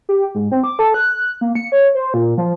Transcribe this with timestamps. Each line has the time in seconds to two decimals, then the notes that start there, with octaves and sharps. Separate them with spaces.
0.09 G4
0.35 G#2
0.51 C4
0.64 D6
0.79 A4
0.94 F#6
1.41 A#3
1.55 C#7
1.72 C#5
1.95 C5
2.14 A#2
2.38 F3